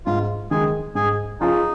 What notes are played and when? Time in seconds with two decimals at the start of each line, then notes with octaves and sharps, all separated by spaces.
0.06 G#2 F4
0.51 D#3 G#3 G#4
0.95 G#2 G#4
1.41 F3 C#4 D#4 F4 G#4